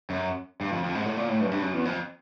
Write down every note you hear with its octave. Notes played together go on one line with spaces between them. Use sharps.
F#2
G2
F2
F2
G#2
A2
A#2
A2
G2
F#2
G2
F#2
E2
F2